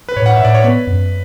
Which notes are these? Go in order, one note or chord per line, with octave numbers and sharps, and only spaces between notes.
B4
A2 C#5
F#5
A2 E5
D5
C#5
B3 B4
F#2